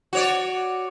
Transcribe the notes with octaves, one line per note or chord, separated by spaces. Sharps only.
F#4 C#5 D5